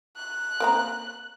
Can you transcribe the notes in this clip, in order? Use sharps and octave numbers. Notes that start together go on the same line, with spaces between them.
F#6
A#3 C4 A#5